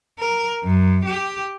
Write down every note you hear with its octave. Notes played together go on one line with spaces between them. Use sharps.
A#4
F#2
G4